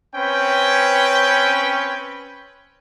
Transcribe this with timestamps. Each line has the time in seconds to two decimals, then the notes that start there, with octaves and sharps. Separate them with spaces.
0.15 C4 C#4 B4 G5